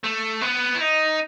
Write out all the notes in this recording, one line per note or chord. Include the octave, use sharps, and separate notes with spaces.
A3
B3
E4
D#4